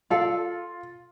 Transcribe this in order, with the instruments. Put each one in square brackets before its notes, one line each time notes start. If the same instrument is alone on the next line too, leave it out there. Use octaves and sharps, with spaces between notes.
[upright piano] F4 [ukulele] A4 D5 F5